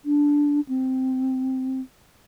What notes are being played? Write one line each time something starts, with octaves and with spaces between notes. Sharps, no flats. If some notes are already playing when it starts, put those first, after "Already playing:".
D4
C4